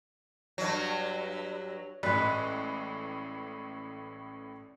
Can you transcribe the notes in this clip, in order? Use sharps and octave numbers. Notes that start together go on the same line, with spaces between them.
G2 F#3
A1 A2 G#3 B4 D5